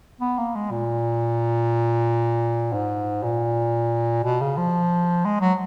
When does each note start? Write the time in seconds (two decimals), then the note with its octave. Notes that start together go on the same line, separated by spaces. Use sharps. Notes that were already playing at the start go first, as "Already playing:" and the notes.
0.21 B3
0.38 A#3
0.55 G#3
0.71 A#2
2.73 G#2
3.23 A#2
4.24 B2
4.41 C#3
4.57 F3
5.25 G#3
5.41 F#3